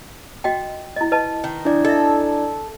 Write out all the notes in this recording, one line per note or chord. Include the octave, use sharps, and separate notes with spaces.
F#4 D#5 G5
E4 D#5
B4 D#5 A5
D#3
D4 E4 D5
A4 D#5 E5